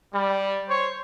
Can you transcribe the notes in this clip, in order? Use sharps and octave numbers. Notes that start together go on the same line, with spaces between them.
G3
C5 C#5